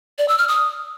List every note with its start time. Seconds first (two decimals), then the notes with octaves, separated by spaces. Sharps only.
0.18 D5
0.28 E6
0.38 F6
0.48 D#6